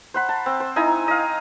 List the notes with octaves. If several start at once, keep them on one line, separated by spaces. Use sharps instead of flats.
C5 F#5 B5
A5
C4
C5
D#4 E4 G#5 A#5
D#5 F5